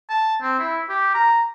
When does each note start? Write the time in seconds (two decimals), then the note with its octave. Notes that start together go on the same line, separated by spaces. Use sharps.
0.10 A5
0.42 C4
0.59 E4
0.89 G4
1.14 A#5